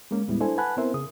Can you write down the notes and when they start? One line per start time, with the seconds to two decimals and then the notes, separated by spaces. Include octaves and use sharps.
0.11 G#3 A#3 C#4
0.28 E2 A#2 G3 G#3 B3 E4
0.41 D4 E4 A4 C5 G#5
0.57 B4 F#5 G#5 A5 B5 F#6
0.77 B3 C4 E4 A#4 C5 E5
0.94 C#3 G#4 D#6